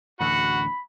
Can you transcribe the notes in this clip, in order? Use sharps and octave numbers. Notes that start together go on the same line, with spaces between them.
A1 D2 F#4 F#5 B5